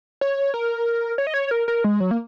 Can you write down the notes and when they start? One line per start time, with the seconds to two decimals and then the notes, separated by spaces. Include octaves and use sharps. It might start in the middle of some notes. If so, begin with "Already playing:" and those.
0.21 C#5
0.54 A#4
1.18 C#5
1.27 D#5
1.34 C#5
1.51 A#4
1.68 A#4
1.84 G#3
2.00 F#3
2.11 A#3